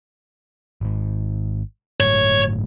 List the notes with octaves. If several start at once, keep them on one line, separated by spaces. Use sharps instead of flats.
G#1 G#2
G1 A2 F#3 C#5